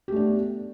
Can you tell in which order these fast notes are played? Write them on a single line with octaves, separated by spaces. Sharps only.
G4 A3 D4 B3